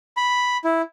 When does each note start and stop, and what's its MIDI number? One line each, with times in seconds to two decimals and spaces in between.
0.17 0.57 83
0.64 0.82 64